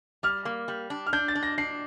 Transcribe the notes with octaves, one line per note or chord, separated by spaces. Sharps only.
G3 F6
A#3
G3
D4
F6
D4 G6
A6
D4
A#6
D4 C7